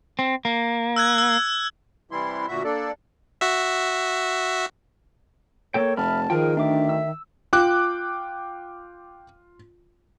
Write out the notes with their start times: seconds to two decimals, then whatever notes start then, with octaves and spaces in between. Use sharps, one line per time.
0.19 C4
0.45 A#3
0.96 E6 F#6 G#6
1.18 E6
2.11 C3 E3 G3 E4 C6
2.48 D2 A#2 F#4 E5
2.64 A#3 D4 A4 D5
3.41 F#4 E5
5.74 A#3 A4 C#5 G5
5.97 F1 E5 A5 B5 F6
6.30 D#3 F3 G#4 A#4 G5
6.57 D2 D4 E5 D6
6.89 E6
7.53 F4 G5 D6 F#6